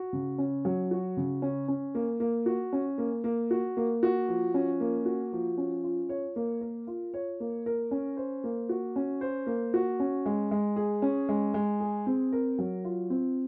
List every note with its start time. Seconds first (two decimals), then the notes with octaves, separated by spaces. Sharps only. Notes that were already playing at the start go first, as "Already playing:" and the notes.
Already playing: F#4
0.13 C#3
0.38 C#4
0.65 F#3
0.91 F#4
1.17 C#3
1.42 C#4
1.68 C#4
1.95 A#3
2.20 A#3
2.46 F#4
2.73 C#4
2.98 A#3
3.24 A#3
3.51 F#4
3.77 A#3
4.03 F#4
4.28 F3
4.54 C#4
4.80 A#3
5.06 F#4
5.33 F3
5.58 C#4
5.84 F4
6.09 C#5
6.36 A#3
6.61 A#4
6.87 F4
7.14 C#5
7.40 A#3
7.66 A#4
7.91 C#4
8.17 C5
8.44 A#3
8.69 F#4
8.96 C#4
9.21 C5
9.47 A#3
9.74 F#4
10.00 C#4
10.26 G#3
10.51 G#3
10.76 G#4
11.02 C#4
11.29 G#3
11.54 G#3
11.80 G#4
12.07 C4
12.33 A#4
12.59 F#3
12.85 F4
13.10 C4